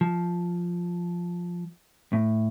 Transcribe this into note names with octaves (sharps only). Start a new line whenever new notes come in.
F3
A2